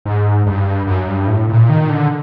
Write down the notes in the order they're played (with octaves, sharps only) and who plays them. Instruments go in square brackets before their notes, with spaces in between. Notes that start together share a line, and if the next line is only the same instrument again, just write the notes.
[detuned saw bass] G#2
G2
F#2
G2
A2
A#2
D#3
D3